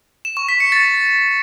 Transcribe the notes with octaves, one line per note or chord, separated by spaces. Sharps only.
E7
C#6
B6
C#7
A6